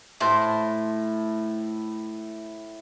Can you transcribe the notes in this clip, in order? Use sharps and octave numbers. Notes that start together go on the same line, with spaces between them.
A2 E4 C5